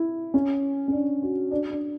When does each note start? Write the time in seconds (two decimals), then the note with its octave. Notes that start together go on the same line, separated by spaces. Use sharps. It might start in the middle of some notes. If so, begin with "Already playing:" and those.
Already playing: E4
0.34 C#4
0.88 C#4
0.92 D4
1.22 F#4
1.51 D4
1.71 D4